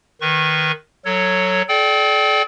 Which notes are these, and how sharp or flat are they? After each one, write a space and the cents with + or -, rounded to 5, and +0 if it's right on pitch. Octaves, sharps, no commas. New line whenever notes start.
D#3 +0 B4 +0 C#6 -30
F#3 +0 A4 +20 C#5 +0
A4 -45 D5 +0 G5 -15